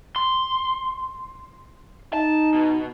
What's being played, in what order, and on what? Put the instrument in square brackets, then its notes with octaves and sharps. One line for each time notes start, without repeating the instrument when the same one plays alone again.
[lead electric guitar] C6
[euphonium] D#4 [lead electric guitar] A5
[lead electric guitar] B2